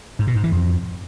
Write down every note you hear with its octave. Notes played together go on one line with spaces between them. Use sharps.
G#2
B2
G#2
E3
F2